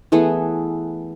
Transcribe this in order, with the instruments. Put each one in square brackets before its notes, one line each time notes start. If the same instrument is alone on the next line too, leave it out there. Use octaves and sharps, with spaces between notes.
[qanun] E3 A3 B3 G#4